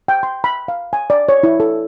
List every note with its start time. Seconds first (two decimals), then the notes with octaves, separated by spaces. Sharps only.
0.08 G5
0.23 C6
0.44 B5
0.68 F5
0.93 G#5
1.10 D5
1.29 C#5
1.43 E4
1.60 A4